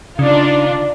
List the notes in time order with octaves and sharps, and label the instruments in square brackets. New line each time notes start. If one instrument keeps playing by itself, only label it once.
[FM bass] C#3 [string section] D4 D#4 F4